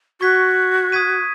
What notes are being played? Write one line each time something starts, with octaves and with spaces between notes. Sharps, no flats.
F#4 C#6 G#6 B6
D#6 G#6 B6 D#7